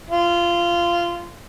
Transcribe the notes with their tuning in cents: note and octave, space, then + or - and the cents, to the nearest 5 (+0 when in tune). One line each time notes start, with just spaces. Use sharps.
F4 -20